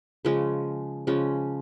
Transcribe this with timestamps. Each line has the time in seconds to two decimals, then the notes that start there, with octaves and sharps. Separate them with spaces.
0.25 C#3 F3 G#3 C#4
1.07 C#3 F3 G#3 C#4